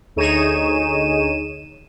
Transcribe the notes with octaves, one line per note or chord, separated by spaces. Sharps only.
D2 D#4 G#4 C#5 D#7 E7